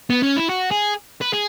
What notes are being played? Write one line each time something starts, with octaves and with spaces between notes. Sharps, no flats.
B3
C#4
E4
F#4
G#4
B4
G#4